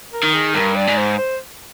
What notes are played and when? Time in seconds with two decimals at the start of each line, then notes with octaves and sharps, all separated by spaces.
0.13 A#4
0.24 D#3
0.34 G#4
0.55 G2 A#4
0.76 D5
0.87 G#2
0.97 C5
1.18 C5